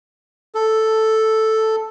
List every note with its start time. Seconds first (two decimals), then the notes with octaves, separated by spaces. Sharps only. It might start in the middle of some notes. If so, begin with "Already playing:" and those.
0.55 A4